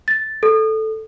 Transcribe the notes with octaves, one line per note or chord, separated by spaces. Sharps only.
A6
A4